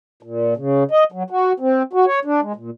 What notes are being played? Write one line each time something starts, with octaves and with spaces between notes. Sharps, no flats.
A#2
C#3
D#5
F#3
F#4
C4
F#4
C#5
D4
G#3
A#2